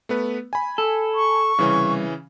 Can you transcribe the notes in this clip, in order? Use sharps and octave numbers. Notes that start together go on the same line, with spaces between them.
A3 B3 B4
G#5 B5
A4
C#6
C2 C#3 E3 C#4